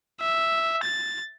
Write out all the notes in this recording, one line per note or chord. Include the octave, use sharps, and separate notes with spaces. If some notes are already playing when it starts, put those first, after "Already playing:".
E5
A6